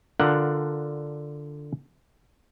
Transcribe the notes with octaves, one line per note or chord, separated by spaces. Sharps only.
D3 D4 F4 A#4 F#5